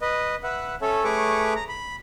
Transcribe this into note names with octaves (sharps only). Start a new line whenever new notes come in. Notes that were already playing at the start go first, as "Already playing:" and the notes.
B4 D#5
B4 E5 F#5
C#4 A4 C#5 E5
A3 G#4 B4 C#5 C#6 D6
A#5
B5